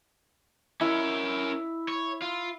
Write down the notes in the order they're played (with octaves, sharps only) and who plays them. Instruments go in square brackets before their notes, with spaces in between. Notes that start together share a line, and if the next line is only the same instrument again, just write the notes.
[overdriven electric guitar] C#4 A#4 [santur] E4
[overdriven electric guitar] C#5
F4